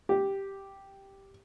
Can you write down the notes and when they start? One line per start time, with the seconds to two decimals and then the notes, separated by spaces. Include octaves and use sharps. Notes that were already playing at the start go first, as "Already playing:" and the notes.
0.09 G4